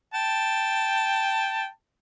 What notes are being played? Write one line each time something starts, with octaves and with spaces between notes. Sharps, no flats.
G5 A5